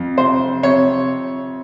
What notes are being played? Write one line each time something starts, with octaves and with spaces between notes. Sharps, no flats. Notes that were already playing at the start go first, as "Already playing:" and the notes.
Already playing: F2
C3 C5
C3 C#5